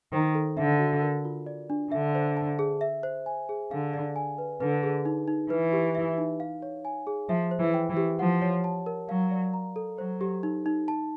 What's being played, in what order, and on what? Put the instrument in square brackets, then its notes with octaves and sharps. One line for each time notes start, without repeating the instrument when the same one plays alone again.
[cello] D#3 [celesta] C5
[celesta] A4
[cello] D3 [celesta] E5
[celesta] F#4
A#4
F4
D5
D4
[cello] D3 [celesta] E5
[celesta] C5
A5
G#4
E5
C5
G#5
G#4
[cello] D3 [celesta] F5
[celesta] D5
G#5
B4
[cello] D3 [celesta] B4
[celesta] G#4
D#4
D#4
[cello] E3 [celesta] B4
[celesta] G4
E5
D#4
F5
C#5
G#5
G#4
[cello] F3 [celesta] E5
[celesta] C5
[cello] E3
[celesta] G5
[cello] E3
[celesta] G4
[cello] F3 [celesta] F#5
[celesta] C#5
A5
A#4
[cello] F#3 [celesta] F5
[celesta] D5
A#5
A4
[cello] F#3 [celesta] C5
[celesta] G4
D#4
D#4
A5